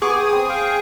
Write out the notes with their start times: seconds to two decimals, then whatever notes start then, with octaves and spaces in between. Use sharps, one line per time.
0.02 B3 G#4 C#6 D6
0.15 G5
0.32 C4
0.49 F5 G5